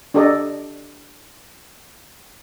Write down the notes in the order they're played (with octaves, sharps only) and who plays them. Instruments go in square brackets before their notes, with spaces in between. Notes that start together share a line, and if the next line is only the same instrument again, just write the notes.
[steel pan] D4 G4 A4 D5 D#5